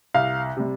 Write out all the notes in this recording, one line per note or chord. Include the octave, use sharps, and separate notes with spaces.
C2 F5
C3 G3